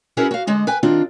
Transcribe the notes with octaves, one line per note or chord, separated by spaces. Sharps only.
C#4 E4 F#4 G#4 A#4 B4
F#4 F5
D3 G#3 D#5
B4 G5 G#5
D#3 C4 D4 F4